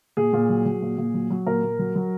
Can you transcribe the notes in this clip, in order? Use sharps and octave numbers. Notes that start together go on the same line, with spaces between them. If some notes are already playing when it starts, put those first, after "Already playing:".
A#2 G#4
A#2
F#3
F#3
A#2
A#2
F#3
F#3
A#2 A#4
A#2
F#3
F#3